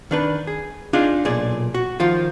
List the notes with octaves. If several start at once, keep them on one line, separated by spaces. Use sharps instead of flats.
D#3 D4 B4
G#4
D4 D#4 F4 G#4 D5
B1 A#2 G#4 D5
F#4
D#3 F3 F4